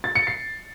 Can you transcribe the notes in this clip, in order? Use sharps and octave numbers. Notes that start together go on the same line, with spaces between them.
A6
C#7
C7